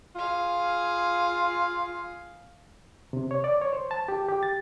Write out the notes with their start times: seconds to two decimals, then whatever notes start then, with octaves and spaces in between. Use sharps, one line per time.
0.16 F4 G#4 F5
3.13 C3
3.31 C#5
3.44 D5
3.61 C#5
3.73 C5
3.91 A5
4.08 G4
4.28 G4
4.43 A6